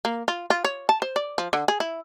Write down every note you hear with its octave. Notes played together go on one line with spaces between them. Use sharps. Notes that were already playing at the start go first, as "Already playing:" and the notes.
A#3
F4
F4
C#5
A5
C5
D5
F3
D3
G#4
E4